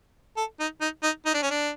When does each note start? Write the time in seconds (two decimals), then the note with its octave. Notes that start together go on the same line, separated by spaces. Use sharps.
0.37 A4
0.60 D#4
0.81 D#4
1.03 D#4
1.26 D#4
1.34 D4
1.42 C#4
1.51 D4